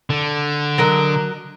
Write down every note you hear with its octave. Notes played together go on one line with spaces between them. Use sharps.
D3
F#3 A#4 D#5